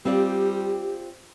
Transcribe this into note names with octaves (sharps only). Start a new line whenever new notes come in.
G3 C4 F4 G4 D5